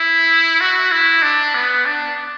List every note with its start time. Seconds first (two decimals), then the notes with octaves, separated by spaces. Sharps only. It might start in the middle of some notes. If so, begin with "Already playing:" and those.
Already playing: E4
0.60 F#4
0.91 E4
1.22 D4
1.54 B3
1.86 D4